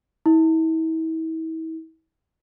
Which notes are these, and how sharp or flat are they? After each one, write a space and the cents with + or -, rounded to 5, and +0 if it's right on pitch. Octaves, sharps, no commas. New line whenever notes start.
E4 -40